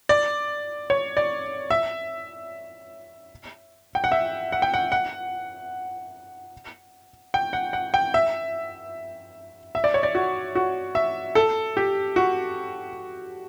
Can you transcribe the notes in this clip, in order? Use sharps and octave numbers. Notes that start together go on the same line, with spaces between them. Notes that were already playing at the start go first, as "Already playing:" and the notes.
D5
C#5
D5
E5
G5
F#5
E5
F#5
G5
F#5
F#5
G5
F#5
F#5
G5
E5
E5
D5
C#5
D5
F#4
F#4
E5
A4
G4
F#4